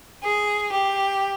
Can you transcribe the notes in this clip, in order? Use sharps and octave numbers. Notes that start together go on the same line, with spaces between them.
G#4
G4